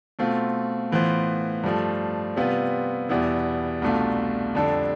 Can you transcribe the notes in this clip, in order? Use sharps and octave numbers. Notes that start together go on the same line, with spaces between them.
B2 A3 C4 F4
A2 E3 B3 F4 C5
G2 F3 A3
C3 G3 B3 F4 B4
E2 B2 G3 B3 E4
C2 B2 A3 D4 F4
F2 D3 G3 D4 A4